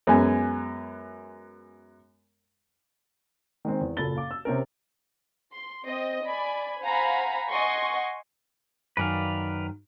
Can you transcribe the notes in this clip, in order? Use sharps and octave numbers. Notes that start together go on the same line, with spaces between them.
F#2 G#3 B3 G#5
D#3 G#3 C4
E2
F#1 A#2 A4 B5 A6 G7
F5 D6
E6
C3 C4 C#4 A#4
C6
C4 D#5
D5 G#5 B5
C5 F5 F#5 G#5 A#5 B5
D#5 F#5 G#5 C6 C#6
F#2 D#3 B4 D5 F5